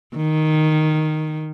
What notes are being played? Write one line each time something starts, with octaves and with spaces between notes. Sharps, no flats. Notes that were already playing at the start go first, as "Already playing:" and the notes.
D#3